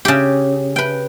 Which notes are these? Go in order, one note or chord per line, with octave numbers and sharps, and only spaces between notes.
C#3 G4
B4 G5